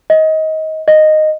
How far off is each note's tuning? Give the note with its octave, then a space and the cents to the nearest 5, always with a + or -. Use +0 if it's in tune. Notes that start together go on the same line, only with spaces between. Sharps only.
D#5 +25
D#5 -10